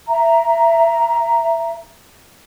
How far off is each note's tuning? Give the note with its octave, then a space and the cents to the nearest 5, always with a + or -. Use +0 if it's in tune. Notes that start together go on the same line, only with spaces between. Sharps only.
E5 +15 A#5 +0